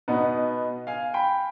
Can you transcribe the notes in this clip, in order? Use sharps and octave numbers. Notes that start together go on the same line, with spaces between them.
B2 B3 D#4
F5 G#5
G5 B5